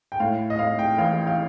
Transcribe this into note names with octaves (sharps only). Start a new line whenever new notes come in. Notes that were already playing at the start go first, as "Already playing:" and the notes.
G5
A2 F5
D#5
A2 F5
G5
A1 F5
F5